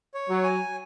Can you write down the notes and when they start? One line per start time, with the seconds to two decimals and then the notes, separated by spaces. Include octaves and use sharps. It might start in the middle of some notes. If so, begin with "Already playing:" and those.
0.14 C#5
0.29 F#3
0.43 G#5